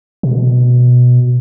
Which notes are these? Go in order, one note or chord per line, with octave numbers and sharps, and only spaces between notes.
B2